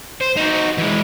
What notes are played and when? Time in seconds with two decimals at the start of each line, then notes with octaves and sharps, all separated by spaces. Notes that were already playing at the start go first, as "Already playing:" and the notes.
0.21 C5
0.37 D#4 F#4
0.78 E3 G#3